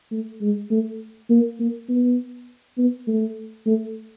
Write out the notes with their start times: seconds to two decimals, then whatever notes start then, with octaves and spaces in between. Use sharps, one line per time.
0.12 A3
0.41 G#3
0.71 A3
1.30 A#3
1.60 A#3
1.89 B3
2.78 B3
3.08 A3
3.67 A3